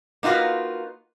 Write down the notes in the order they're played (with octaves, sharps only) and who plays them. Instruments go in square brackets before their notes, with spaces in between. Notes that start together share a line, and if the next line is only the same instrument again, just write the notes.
[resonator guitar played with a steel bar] A#3 D#4 F4 F#4 B4